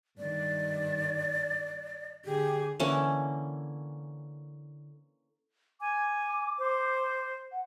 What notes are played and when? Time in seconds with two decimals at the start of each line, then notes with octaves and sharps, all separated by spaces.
0.18 G2 D#3 D5
2.25 D3 G4 G#4
2.80 D3 E3 A#3 C#4
5.81 G#5 D6
6.59 C5
7.52 F#5